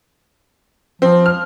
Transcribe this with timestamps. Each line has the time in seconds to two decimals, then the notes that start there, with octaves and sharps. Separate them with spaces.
1.02 F3 C4
1.26 F6